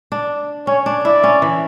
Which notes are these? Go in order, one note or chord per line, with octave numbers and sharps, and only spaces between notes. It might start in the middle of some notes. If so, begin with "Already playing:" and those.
D4
C#4 C#5
D4
E4 D5
C#4
E3